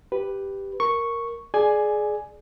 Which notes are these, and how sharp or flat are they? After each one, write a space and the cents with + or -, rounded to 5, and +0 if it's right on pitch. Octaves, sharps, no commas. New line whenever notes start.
G4 +0 B4 +0
A#4 +0 C#6 +0
G#4 +20 D5 +10 G#5 +5